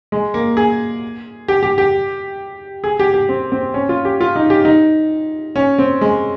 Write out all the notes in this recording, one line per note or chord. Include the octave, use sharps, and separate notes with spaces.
G#3
A#3
G#4
G4
G4
G4
G#4
G4
G4
C4
C4
C#4
F4
G4
F4
D#4
G4
D#4
C#4
C4
G#3